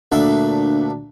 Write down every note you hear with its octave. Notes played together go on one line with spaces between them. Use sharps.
D2 A#2 D4 E5